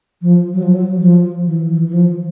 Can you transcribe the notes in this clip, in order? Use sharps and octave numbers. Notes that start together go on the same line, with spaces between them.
F3
F#3
F3
F#3
F3
E3
E3
E3
F3